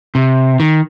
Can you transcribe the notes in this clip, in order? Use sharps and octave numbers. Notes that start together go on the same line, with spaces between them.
C3
D#3